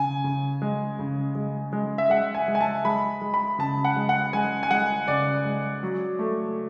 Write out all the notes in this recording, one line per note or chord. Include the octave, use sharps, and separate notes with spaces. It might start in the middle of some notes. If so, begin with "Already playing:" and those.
Already playing: C#3 G#5
C#3
G#3
C#3
G#3
G#3
E5
G#3 F#5
G#5
G#3
G#5
A5
G#3 B5
G#3
B5
C#3 A5
F#5
G#3
F#5
G#3 G#5
G#5
G#3 F#5
C#3 D5
G#3
F#3
A3